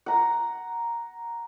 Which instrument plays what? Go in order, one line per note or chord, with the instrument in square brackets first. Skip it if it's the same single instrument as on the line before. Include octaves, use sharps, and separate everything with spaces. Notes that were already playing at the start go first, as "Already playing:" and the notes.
[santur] F#5 A#5